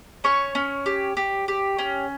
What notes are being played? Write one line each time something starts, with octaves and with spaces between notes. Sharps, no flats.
C#4 C#5 C#6
C#4
G4
G4
G4
C#4